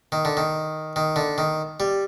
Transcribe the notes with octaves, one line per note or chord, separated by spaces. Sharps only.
D#3
D3
D#3
D#3
D3
D#3
G3